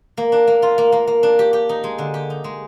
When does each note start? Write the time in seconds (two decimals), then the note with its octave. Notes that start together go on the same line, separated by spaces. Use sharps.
0.17 A#3
0.32 D4
0.47 A#3
0.62 F4
0.78 A#3
0.92 A#3
1.07 A#3
1.23 D4
1.39 G4
1.53 G4
1.69 D#4
1.84 G#3
1.98 D3
2.14 G4
2.30 D#4
2.44 G#3